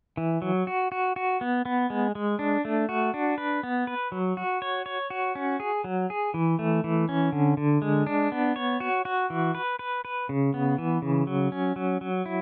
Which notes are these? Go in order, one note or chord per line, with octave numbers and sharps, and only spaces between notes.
E3
F#3
F#4
F#4
F#4
B3
B3
G#3
G#3
D4
A3
F#4
D4
B4
B3
B4
F#3
F#4
C#5
C#5
F#4
C#4
G#4
F#3
G#4
E3
A3
E3
C#4
D3
D3
G#3
D4
B3
C#5
F#4
F#4
E3
B4
B4
B4
C#3
B3
E3
C#3
F#3
C#4
F#3
F#3
E4